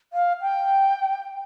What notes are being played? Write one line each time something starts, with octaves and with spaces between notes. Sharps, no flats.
F5
G5